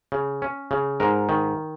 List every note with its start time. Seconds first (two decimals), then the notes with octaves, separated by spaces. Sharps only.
0.12 C#3
0.42 C#4
0.71 C#3
1.00 G#2 A#4
1.29 D#3